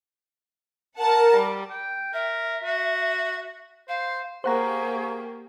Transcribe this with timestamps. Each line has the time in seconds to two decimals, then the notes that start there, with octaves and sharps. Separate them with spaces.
0.98 A#4 F#5 A5
1.34 G3
1.70 G5
2.13 A#4 E5
2.64 F#4
3.88 C5 F5
4.44 A#3 G4 G#4 C5 F#5 A#5 C#6